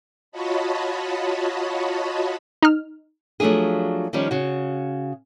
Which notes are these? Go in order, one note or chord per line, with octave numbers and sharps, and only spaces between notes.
F4 F#4 C#5 D#5 A5 B5
D#4 F6
F3 F#3 A3 D4 G#4
D#3 F3 G3 C#4
C#3 F#4